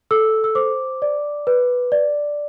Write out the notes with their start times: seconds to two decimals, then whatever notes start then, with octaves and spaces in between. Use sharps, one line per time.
0.11 A4 E6
0.44 E6
0.55 C5 D6
1.02 D5
1.47 B4
1.92 D5